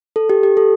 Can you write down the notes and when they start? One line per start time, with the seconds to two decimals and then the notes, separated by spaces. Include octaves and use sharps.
0.16 A4
0.30 G4
0.43 G4
0.57 A4